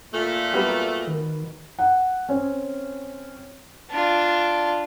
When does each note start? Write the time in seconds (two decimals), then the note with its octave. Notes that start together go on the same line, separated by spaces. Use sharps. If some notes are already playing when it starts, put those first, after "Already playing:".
0.12 A#2 A3
0.53 F#3 G3 B3
1.07 D#3
1.79 F#5
2.29 C4 C#4
3.91 D4 F4